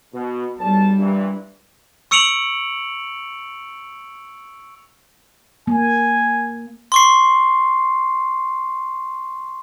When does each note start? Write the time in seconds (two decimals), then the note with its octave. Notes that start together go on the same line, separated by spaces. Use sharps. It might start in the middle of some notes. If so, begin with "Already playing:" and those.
0.14 B2
0.59 B1 G3 A5
0.99 G2 A#2 E3
2.11 C#6 E6 C#7 D7 F7 F#7
5.67 A#3 G#5
6.92 C6 C#6 C7